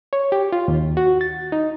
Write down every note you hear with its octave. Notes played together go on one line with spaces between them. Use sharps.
C#5
G4
F4
D#2
F#4
A6
D#4